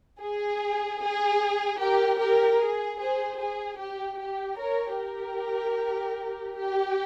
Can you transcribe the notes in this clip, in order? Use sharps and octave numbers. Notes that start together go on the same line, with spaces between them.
G#4
G#4
G4 A#4
G4 A#4
G#4
G#4 C5
G#4
G4
G4
A#4 C#5
G4 A#4
G4